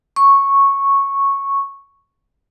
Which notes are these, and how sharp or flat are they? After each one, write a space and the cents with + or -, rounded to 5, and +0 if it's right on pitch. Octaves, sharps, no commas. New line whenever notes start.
C#6 -10